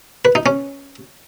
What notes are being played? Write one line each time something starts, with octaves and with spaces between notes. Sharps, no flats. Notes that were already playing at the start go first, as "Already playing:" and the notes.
B4
D#4
C#4